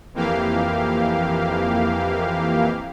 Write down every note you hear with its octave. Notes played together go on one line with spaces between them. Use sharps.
F2 E3 A#3 G4 F5